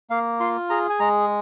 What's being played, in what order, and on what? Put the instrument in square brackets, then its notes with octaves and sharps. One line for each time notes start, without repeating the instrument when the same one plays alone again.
[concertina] A#3 F5
F4 C6
G#4 A#5
G#5
G#3 A#5